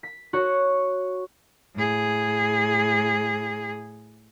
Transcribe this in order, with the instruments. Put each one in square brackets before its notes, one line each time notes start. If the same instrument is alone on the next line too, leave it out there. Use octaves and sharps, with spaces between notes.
[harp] B6
F#4 C#5
[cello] A2 G#4